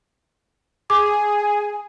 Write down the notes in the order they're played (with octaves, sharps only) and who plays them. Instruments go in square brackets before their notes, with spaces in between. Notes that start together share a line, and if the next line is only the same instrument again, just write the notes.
[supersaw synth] G#4 [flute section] G#5 [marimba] D6